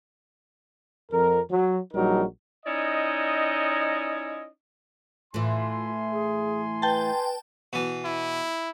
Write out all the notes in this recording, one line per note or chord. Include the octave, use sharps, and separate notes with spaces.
F2 A#4
F#3
A#1 F#3 G3 D#4 F#4 A#4
C#4 D#4 E4 D5 D#5
A2 E3 F4 G#5 C6
G#4
B4 G5 A5
B2 E3
E4